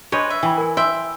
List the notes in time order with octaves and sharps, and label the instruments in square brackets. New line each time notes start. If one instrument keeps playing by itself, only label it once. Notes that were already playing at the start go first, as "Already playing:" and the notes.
[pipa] G#3 [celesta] D4 G6 [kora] B4 C#5 D#5
[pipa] E5
[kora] E3 [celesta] G5 B5
[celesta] A#4 G#5
[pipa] E5 [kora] G5 [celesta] C6